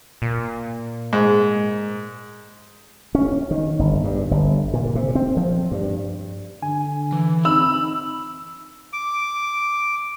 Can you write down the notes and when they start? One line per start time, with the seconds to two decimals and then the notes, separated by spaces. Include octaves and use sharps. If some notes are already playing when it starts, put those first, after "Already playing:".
0.22 A#2
1.13 G#2
3.15 C#4
3.51 D#3
3.79 G1
4.04 G2
4.31 G1
4.73 A#2
4.95 C3
5.15 C4
5.37 F3
5.71 G2
6.63 D3 G#5
7.12 E3
7.45 C4 D#4 B5 E6
8.93 D6